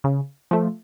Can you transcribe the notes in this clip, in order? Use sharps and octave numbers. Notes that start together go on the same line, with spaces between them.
C#3
F3 A3